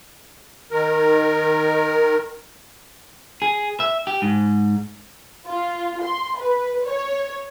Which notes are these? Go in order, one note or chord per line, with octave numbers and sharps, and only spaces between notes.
D#3 A#4
G#4
E5
G4
G#2
F4
C6
B4
C#5